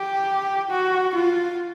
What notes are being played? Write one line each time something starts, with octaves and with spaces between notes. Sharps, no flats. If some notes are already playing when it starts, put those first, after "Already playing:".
Already playing: G4
F#4
F4